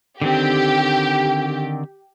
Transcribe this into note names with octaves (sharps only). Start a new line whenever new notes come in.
D3 D#3 C4 G4